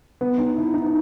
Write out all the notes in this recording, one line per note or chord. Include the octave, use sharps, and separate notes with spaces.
B3
D#4
E4
D#4
D#4